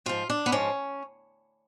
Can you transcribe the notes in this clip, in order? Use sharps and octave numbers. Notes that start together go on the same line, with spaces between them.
G#2 F3 F4
D4
B3
G#2 F3 C#4